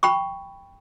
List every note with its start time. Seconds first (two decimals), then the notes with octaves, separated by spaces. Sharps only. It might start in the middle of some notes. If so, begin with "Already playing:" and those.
0.03 G5 B5 C#6